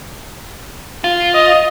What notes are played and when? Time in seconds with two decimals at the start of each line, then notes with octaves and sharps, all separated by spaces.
1.04 F4
1.34 D#5